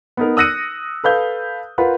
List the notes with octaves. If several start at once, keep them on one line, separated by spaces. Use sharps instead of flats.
B3 D#4 A#4
D#6 E6 F#6 A#6 C#7 D#7
A4 B4 F5 G6
F4 A#4 B4 F#5